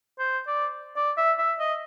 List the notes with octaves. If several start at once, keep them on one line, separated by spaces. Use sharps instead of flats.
C5
D5
D5
E5
E5
D#5